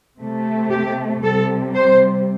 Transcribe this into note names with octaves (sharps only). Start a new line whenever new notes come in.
C3 A3
G4
C3 G3 A4
C5